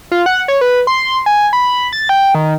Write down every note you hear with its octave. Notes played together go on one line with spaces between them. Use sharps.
F4
F#5
C#5
B4
C6
G#5
B5
A6
G5
D#3